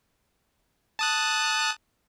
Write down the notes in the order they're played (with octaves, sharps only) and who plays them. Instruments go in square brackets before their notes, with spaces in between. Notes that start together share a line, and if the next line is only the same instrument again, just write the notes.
[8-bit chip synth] A5 D#6 F#6